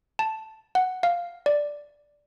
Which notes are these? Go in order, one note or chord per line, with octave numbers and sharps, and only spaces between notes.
A5
F#5
F5
D5